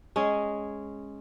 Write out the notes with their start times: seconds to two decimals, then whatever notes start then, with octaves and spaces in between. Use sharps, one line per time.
0.16 G#3 C#4 G#4